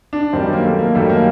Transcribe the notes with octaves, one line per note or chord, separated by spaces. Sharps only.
D4
F#2 D#3 G3 C4
A#3
A3
A#3
F#2 D#3 G3 A3
A#3